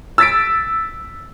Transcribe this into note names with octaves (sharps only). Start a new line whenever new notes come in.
E6 A6 B6 D7